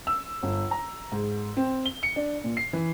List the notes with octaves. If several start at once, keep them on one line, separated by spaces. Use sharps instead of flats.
E6
G1
A#5
G#2
C4
G7
C#7
D4
A#2
C7
E3